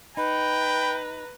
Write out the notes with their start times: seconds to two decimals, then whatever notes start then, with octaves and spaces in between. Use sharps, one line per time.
0.17 D#4 B4 G5 A#5 B5